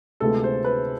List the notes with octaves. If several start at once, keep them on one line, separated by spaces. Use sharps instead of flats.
D2 C3 G#3 B3 F4 A4
C5
B4